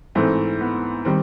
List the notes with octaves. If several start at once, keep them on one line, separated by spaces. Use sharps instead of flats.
G#2 E3 A3 C4
B3
D#3 G3 C4